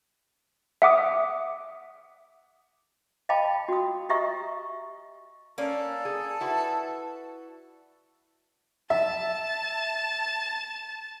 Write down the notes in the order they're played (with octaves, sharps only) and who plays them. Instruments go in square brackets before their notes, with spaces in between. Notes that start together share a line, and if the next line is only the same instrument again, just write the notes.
[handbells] E5 F#5 D6 D#6
[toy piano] D#5 F5 G5 A5 B5 D6
F#4 D#6
G4 D#5 E5 A#5 C#6 D#6
[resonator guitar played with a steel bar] A#3 C#4 [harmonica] A4 [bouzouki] D5
[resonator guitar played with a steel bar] G#4
E4 F#4 B4
[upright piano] E5 [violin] A5